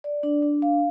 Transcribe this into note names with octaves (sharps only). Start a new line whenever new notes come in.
D5
D4
D4
F5